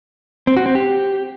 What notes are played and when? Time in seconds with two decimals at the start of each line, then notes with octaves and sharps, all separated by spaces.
0.47 C4
0.57 F#4
0.66 C4
0.75 G4